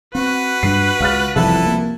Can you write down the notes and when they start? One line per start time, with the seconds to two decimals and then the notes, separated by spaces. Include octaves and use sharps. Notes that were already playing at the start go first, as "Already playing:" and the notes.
0.15 C4 F#4 B4
0.63 G2 G3 D4 C7
1.00 C#2 F5 F6 A6
1.36 F1 C2 C#3 E3 F3 E4 A4
1.66 A#3